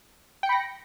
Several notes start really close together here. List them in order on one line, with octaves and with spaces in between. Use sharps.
G5 C#7 B5 A#6